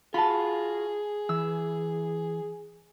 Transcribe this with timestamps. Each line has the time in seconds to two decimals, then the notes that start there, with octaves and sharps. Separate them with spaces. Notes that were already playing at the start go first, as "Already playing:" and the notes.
0.14 F4 F#4 G#4 A5 B5
1.29 E3 E6